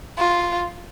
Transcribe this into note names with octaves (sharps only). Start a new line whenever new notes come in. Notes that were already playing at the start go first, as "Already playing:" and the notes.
F4